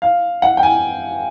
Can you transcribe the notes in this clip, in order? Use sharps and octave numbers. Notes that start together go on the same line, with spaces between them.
F5
F#5
G5
G#5